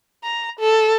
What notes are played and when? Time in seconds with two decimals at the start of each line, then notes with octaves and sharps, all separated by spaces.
0.24 A#5
0.59 A4